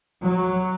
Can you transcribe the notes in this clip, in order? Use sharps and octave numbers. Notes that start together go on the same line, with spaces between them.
F#3